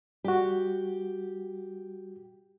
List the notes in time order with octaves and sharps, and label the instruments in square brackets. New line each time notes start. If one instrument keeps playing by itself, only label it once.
[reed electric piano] G3 F#4 [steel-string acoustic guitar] G4